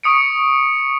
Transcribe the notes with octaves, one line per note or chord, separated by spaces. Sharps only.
C#6 D#6 C#7 D7